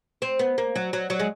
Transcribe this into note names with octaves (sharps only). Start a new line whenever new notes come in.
C4
B3
A#3
F#3
F#3
F#3
G#3